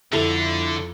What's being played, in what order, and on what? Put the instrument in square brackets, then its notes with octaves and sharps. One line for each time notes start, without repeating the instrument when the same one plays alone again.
[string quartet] F2 [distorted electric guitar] D3 [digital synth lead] E4 [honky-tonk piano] A4